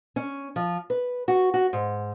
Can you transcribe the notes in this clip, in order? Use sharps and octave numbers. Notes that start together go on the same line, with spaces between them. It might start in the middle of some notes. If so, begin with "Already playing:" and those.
C#4
F3
B4
F#4
F#4
G#2